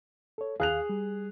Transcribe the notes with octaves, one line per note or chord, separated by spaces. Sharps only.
A4 C#5
D#2 G#4 F5 F#6 F7
G3